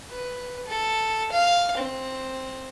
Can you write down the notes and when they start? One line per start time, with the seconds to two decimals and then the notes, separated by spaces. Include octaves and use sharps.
0.10 B4
0.67 A4
1.32 F5
1.77 C4